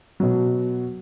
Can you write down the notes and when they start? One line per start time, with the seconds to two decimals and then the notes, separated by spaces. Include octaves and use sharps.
0.20 B2 F#3